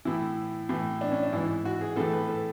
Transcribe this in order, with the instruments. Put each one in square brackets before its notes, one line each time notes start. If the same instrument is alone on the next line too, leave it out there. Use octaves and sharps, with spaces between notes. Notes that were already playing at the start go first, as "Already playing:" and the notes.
[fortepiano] A2 E3 E4
A2 E3
D4
C#4
D4
G#2 E3 E4
F#4
G#4
A2 E3 A4
B4
A4